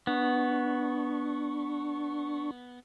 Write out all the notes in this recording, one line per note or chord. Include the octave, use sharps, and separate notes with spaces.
B3 D4 C#6